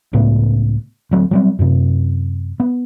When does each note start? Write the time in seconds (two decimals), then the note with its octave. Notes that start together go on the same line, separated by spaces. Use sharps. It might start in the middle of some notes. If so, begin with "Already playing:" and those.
0.13 C#2 A2 B3
1.11 D2 F#3 C4
1.31 F#3 G3 C4
1.59 F#2 C3
2.60 B3